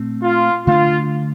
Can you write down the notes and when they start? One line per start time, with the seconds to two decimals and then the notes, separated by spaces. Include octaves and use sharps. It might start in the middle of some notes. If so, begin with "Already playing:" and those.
Already playing: A#2 A3 C4
0.22 F4
0.66 D3 A3 D4 F4